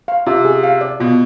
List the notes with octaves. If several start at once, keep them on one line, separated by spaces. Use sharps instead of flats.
F5
C3 F4
G#4
F5
D5
B2 F4